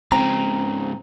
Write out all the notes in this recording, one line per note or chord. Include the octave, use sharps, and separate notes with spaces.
G#2 C#3 C4 A#5